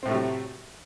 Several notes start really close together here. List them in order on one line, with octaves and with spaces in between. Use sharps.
C4 A2 A3 C3 F#3